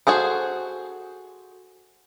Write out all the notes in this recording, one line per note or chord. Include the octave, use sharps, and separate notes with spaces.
F#4 G#4 A4 C5